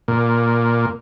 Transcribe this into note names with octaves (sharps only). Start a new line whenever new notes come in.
A#2